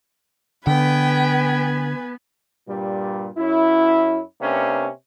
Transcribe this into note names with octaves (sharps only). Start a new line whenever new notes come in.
D3 B3 B4 G5 G#5
G2 A#2 G3
F#2 C#4 E4
C3 A#3 C#4 D4 B4